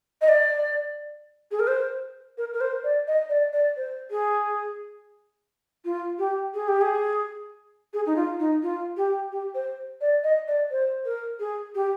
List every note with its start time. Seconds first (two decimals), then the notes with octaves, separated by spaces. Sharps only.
0.22 D#5
0.29 D5
1.51 G#4
1.60 A#4
1.67 C5
2.38 A#4
2.53 A#4
2.61 C5
2.84 D5
3.07 D#5
3.29 D5
3.53 D5
3.77 C5
4.11 G#4
5.85 F4
6.19 G4
6.54 G#4
6.68 G4
6.81 G#4
7.93 G#4
8.06 D#4
8.16 F4
8.39 D#4
8.63 F4
8.97 G4
9.32 G4
9.55 C5
10.01 D5
10.24 D#5
10.48 D5
10.71 C5
11.05 A#4
11.40 G#4
11.75 G4